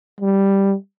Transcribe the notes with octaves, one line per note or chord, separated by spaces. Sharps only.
G3